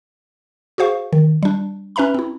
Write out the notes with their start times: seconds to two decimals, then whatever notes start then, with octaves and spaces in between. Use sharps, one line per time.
0.78 F#4 G#4 C5 F5 C#6
1.13 D#3
1.43 G3 D4
1.96 C#4 B4 E5 A#5 B5
2.14 C4 E4